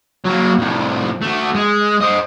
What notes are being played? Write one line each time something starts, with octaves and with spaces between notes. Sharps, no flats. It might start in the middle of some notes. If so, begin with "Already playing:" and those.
F#3 A#3
C2 A2
A3 F#4
G#3
C5 D#5